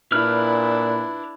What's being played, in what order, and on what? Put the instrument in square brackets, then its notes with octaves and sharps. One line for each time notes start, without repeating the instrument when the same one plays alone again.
[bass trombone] A#2 [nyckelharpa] D4 E4 [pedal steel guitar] B4 F6